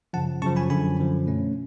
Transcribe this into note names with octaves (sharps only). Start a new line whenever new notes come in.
F#2 C#3 F3 F#5 A5
F#2 C#3 F3 A5 C#6
G#5 B5
F#2 D3 F3 G#5 B5
F#2 D3 F3
B2 A3 C#4